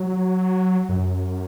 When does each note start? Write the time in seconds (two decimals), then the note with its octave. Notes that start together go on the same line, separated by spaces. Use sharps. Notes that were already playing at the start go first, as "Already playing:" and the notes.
Already playing: F#3
0.89 F#2